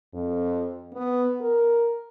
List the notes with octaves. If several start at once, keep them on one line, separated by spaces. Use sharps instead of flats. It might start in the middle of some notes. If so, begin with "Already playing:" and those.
F2
B3
A#4